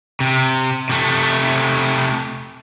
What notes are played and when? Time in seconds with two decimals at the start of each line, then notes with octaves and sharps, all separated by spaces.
0.20 C3
0.89 C3 A3